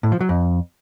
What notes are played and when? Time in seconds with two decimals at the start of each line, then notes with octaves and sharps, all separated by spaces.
0.03 A2
0.12 F3
0.20 F#3
0.29 F2